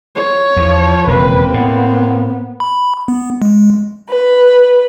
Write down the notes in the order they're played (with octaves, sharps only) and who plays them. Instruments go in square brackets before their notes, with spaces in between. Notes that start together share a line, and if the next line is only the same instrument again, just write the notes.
[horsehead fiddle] C#5
[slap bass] E2 [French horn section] F3
[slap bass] E1 F2 C#3 [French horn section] A#3 C4 [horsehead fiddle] B4
[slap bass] A2 [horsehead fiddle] B3
[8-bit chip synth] B5
B3
G#3
[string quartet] B4